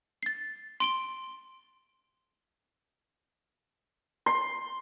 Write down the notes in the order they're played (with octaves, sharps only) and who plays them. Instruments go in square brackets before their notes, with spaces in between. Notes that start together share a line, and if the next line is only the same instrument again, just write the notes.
[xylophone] A6 C7
C6 D7 G7
[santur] C6